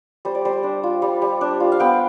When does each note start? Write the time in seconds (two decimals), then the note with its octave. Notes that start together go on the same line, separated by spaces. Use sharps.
0.25 G3 C5
0.35 D5
0.45 G3 C5
0.63 D4
0.83 F4
1.02 G3
1.22 G3
1.41 D4
1.60 F4
1.72 F5
1.80 B3 G5